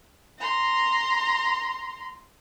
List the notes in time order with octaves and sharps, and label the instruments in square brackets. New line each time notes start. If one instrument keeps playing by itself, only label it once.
[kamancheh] A#5 C6